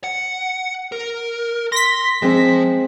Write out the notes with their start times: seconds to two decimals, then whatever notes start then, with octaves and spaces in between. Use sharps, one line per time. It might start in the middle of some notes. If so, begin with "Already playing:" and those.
0.04 F#5
0.92 A#4
1.72 C6 A#6 B6
2.22 F3 G#3 C4